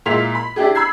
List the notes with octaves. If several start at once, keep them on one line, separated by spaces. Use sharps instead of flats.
A#2 G#3 E4 F5 B6 F7
B5
D4 E4 G4 G#4
B5 E6 G#6 C7